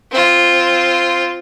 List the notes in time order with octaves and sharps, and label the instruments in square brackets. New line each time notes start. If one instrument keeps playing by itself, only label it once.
[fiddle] C4 F4